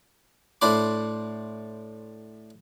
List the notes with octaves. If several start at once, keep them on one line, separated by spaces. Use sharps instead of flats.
A2 D4 C5 B5 D6